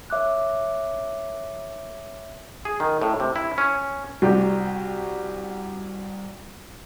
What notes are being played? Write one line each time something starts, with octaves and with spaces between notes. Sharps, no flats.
C#5 E5 D6 F#6
G#4
D#3
A2
C3
E4
C#4
C2 F#4 G4